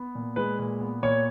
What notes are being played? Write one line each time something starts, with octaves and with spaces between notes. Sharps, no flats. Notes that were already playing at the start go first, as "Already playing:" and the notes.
Already playing: B3
A#2
G#3 B4
A#2
B3
A#2 C#5